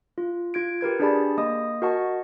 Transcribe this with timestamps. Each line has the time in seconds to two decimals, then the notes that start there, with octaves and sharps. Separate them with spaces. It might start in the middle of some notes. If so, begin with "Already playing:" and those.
0.18 F4
0.54 F4 G#6 D7
0.81 G4 A#4 B4 G#6
0.99 D4 G4 G#4 D5 A5 B5
1.38 A#3 D#5 D#6
1.82 F#4 A#4 D#5 F#5 A5 C#6